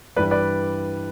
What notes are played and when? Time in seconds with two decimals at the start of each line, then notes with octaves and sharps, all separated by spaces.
0.16 G2 E3 G3 B4 D5
0.31 B4 D5